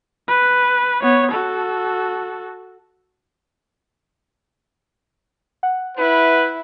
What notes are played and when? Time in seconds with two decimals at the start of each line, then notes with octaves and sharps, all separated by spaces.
0.28 B4
1.02 B3 C#5
1.32 F#4 A4
5.63 F#5
5.97 E4 B4